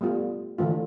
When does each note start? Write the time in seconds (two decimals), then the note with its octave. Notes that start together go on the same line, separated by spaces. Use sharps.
0.01 G3 A3 B3 F4
0.58 D3 E3 A3 F4